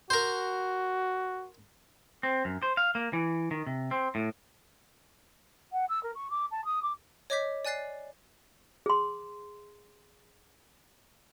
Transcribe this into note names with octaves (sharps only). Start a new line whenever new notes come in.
F#4 A#4 C5
C4
F#2
C5
F5
A#3
E3
D#3
C3
C4
A2
F#5
E6
A#4
C#6
D6
A5
D#6
D6
C#5 D#5 D6 G6 B6
D5 G#5 F#6 A6 C7
G#4 C6